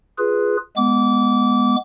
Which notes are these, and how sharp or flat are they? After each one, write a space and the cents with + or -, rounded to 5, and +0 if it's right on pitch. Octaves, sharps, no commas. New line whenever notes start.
F4 +0 G#4 +0 B4 +0
G#3 +0 B3 +0 D6 -25